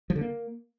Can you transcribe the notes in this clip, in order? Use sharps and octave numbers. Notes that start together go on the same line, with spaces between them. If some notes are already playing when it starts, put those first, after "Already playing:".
F3
D3
A#3